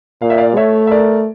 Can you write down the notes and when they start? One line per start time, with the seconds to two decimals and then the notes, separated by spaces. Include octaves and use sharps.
0.22 A#2 F5
0.30 E5
0.38 D5 F5
0.57 A3 C#5 E5
0.87 E5
0.91 A#4 D5